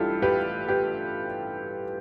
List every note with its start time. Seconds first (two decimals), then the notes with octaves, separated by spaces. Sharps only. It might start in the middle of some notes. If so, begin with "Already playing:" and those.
Already playing: A1 G2 G3 E4 F4 G4 A4
0.22 G4 B4
0.68 G4 B4